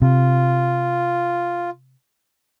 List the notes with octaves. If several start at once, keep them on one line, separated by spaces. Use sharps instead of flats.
C3 F4